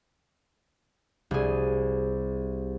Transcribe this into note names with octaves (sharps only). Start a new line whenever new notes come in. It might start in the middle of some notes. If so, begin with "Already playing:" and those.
C2 G#4